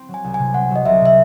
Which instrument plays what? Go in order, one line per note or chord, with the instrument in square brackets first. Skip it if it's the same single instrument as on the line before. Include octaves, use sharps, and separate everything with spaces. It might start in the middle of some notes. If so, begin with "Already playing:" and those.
Already playing: [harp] C4
F#3
[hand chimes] G#5
[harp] C2
[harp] C3 [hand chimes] G#5
[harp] C4 [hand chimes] F#5
[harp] F#3
[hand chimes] D#5
[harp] C2 [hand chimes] E5
[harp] C3 [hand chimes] E5